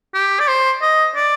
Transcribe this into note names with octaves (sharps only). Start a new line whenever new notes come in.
G4
D5
C5
D#5
D5